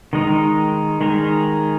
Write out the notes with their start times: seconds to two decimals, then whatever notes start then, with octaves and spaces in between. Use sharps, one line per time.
0.13 D#3 G#3 D#4 A#4
1.01 D#3 G#3 D#4 A#4